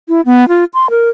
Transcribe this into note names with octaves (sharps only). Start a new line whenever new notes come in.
E4
B3
F4
C6
A#4